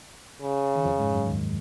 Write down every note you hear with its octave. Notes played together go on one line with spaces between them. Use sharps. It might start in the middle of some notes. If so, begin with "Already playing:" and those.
C#3
D#3
F2 F3
G#2 G#3
F#2 F#3
D#2 D#3